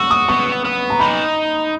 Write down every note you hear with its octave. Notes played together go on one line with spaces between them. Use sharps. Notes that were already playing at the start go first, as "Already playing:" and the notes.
Already playing: F#4 E6
D#6
B3 C#6
B3
A#5
D#4 B5